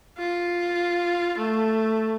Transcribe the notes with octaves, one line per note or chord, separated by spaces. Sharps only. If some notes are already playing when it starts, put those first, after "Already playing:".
F4
A3